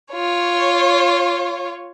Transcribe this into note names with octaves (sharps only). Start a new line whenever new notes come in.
F4 C#5